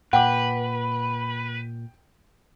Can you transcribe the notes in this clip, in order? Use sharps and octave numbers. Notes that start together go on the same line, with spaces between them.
A#2 B4 F#5 G5 D6